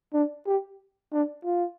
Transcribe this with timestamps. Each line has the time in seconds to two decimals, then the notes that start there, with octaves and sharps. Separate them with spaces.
0.13 D4
0.46 G4
1.13 D4
1.45 F4